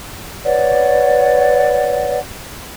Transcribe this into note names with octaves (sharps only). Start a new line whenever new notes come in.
B4 C#5 D5 F#5